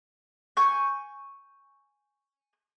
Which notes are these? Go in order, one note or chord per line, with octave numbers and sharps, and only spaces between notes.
G#5 C#6 G6